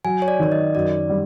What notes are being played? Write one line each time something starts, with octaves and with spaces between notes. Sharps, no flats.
F#3 G#5
C#5
D5
D#3 D5
D#5
F#2 D5
G3